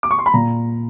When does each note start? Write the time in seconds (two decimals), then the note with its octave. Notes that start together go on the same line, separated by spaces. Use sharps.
0.03 D6
0.11 C#6
0.18 C6
0.26 B5
0.34 A#2 A#5